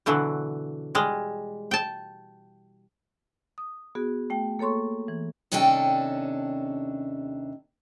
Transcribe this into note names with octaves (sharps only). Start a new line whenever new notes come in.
B2 D3 E3 F#3
G3 G#3
G5 A5
D#6
B3 F#4 G#4
A3 G5
A#3 A4 C#5 C6 C#6
E3
D#2 C3 C#4 D4 A4 G5